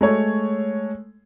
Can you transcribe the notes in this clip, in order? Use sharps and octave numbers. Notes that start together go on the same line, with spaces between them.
G#3 A3 C#5